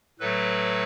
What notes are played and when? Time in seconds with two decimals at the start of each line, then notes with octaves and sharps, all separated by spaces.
0.19 A2 F#3 A3 A4 B4